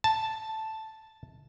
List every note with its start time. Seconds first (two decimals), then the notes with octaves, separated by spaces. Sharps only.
0.04 A5